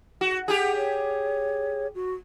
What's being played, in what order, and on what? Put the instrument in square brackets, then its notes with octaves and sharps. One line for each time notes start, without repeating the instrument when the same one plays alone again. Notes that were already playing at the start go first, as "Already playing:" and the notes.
[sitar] F#4
[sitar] G4 G#4 [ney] F#5
[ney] C#5
F#4